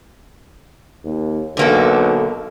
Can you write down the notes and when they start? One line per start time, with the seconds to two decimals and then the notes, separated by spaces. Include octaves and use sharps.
1.04 D#2
1.57 B1 D3 A#3 A4